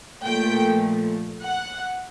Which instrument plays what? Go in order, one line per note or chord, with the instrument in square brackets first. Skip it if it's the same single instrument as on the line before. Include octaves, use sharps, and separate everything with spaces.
[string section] A#2 F3 A3 G5
F#5